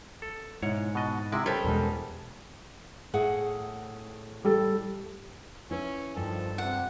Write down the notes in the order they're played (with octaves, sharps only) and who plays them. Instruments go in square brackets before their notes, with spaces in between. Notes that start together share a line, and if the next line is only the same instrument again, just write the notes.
[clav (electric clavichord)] A4
[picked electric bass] G#2 [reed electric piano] B2 E4 [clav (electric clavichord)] C#5 F#5
[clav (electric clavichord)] B2 D#5 [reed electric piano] F#5 F#6 A6
[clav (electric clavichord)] C3 G#3 [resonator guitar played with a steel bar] E4
[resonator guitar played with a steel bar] G3 A4 [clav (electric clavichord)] C#4 [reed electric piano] A#4 C5 A5
[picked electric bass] E2 B2 G#3
[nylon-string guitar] A2 G#4 F#5
[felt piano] G3 A4
[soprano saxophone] C#4 [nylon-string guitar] E4 B4
[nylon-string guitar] G2 [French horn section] D#3 F3 [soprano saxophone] A4
[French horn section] C3 [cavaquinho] F#5